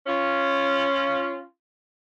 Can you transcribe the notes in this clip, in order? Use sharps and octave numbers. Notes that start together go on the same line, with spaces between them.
C#4 F4